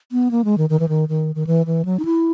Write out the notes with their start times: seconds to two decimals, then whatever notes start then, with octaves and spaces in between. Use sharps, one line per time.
0.12 B3
0.31 A#3
0.45 G#3
0.58 D#3
0.70 D#3
0.80 E3
0.89 D#3
1.09 D#3
1.35 D#3
1.47 E3
1.66 E3
1.85 F#3
1.99 D#4
2.05 E4